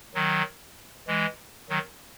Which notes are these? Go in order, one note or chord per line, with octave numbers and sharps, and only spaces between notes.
D#3 F#3
E3 G#3
D#3 F#3